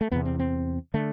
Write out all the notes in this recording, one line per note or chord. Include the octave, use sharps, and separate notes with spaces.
A3
E2 C3 B3
C4
C4
D3 A3